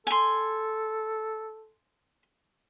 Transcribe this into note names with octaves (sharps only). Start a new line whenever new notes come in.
A4 G#5 C6